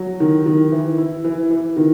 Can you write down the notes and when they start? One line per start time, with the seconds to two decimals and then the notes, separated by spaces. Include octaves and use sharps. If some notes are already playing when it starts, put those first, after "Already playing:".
Already playing: F#3
0.20 D#3
0.46 D#3
0.72 E3
0.98 E4
1.24 E3
1.51 E3
1.77 D#3